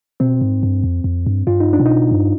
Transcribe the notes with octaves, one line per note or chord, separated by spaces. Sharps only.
B2 C4
G#2
G2
F2
F2
G2
G2 F4
D#4
D4
B2
D#4
G2